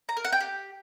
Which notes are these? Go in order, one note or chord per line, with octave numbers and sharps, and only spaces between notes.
A#5
A#4
F#5
G5
G4